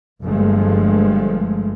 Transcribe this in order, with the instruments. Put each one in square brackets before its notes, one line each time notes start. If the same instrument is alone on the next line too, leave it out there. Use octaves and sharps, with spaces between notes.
[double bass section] G1 G2 F3 G#3 A3